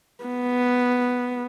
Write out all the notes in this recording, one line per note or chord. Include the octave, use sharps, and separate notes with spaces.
B3